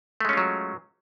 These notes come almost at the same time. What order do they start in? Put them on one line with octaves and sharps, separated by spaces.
A3 G#3 C#4 F4 F#3